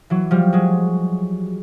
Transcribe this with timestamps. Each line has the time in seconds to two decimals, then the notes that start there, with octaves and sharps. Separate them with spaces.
0.10 E3 F#3
0.31 F3 G3
0.53 F#3 G#3